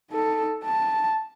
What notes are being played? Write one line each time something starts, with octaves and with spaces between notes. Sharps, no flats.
D#4 A4
A5